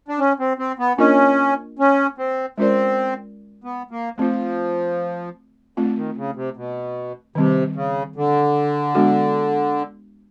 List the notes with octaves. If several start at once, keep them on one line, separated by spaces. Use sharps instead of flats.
D4
C#4
C4
C4
B3
A#3 C#4 D4 F4 A#4 D#5
C#4
C4
G#3 C4 C#4 F4 A#4 D5
B3
A#3
F3 A3 C4 F4
D3 A3 C4 F4
D#3
C#3
C3
B2
C3 D#3 G3 C4
C#3
D3
G#3 B3 D4 F#4 A4